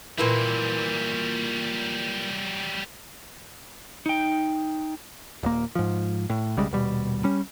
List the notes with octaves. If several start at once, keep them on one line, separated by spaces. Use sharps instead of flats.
A#2 E3 F#3 G3 E4
D#4 G5
D#1 A#3
G#2 F3
A2
B1 C#3 G3 G#3
D#1 B2 G3
G3 C#4